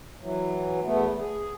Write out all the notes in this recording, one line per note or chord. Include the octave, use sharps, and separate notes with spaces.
E3 F#3
E2 A3 B3
G#4